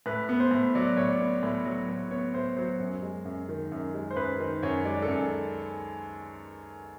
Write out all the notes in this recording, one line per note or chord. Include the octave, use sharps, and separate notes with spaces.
A2 B4
B3
C5
A2
F#3 D5
A2 C#5
D5
B3
A2
F#3
A2
B3 C#5
A2 C5
F#3 C5
F#2
G#3
F#2
D#3
F#2
G#3
C5
F#2 B4
D#3 C5
F#2 C#5
G#3 D5
A4
F#2